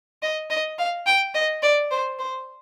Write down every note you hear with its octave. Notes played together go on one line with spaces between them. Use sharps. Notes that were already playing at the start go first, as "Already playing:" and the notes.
D#5
D#5
F5
G5
D#5
D5
C5
C5